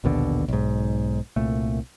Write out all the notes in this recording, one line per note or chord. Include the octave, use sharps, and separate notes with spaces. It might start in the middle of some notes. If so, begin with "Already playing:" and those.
A#1 D#2 B2 D3
B1 G#2
C2 A#2 A3